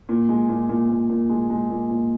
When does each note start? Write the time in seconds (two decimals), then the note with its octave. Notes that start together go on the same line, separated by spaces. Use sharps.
0.09 A#2
0.29 G#3
0.49 A#2
0.69 A#2
0.89 A#2
1.10 A#2
1.29 G#3
1.50 G#3
1.70 A#2
1.90 A#2